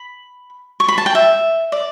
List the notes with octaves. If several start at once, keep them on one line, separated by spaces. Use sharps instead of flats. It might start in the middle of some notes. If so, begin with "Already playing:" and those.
Already playing: B5
C#6
B5
A5
G5
E5
D5